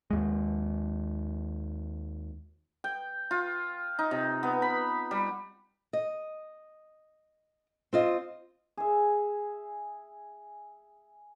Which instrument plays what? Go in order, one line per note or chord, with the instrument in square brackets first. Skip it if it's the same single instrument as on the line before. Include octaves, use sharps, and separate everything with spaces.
[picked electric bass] D#2 G#3
[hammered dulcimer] G5
F4
D#4
C3
B3
B5
G3
[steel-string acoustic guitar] D#5
C4 F4 D#5
[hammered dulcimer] G#4 E5